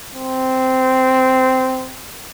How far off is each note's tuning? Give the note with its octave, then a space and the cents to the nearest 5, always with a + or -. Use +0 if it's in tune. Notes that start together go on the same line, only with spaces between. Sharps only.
C4 -10